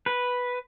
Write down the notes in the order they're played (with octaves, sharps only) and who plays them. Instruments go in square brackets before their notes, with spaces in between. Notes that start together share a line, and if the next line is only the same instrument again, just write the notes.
[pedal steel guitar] B4